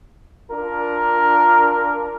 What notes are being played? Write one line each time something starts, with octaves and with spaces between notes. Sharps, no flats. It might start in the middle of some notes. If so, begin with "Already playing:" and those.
D4 F4 A#4